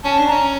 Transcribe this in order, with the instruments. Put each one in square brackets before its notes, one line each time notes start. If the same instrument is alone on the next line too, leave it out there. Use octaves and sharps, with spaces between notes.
[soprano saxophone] C#4 [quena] A5
[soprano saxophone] D4
[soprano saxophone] C#4 [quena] A#5